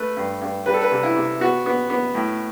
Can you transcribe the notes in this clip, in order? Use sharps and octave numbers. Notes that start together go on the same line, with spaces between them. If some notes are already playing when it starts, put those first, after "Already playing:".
Already playing: A3 B4
G2
G2
G3 B4
A4
B4
C3
E4
C3
B3 F#4
B3
B3
A2